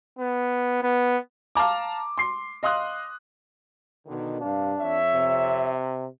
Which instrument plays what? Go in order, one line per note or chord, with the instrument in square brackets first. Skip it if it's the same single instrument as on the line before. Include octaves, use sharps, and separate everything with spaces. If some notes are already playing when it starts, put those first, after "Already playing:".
[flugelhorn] B3
B3
[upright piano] F5 A5 A#5 D6
C6 C7
D#5 F5 C6 D#6 F#6
[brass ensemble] B2 D3 D#3
[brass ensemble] G2 C3 F5 [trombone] D4
[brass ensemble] F2 C#5 E5
[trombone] C3